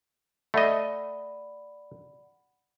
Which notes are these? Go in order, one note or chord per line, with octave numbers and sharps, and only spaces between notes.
A3 D5 D#5 F#5 B5